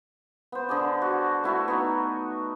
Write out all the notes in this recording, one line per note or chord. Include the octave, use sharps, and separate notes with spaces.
B3 C5
D3 G#4 D6
F#4
A3 E4 F#4
B3 D#4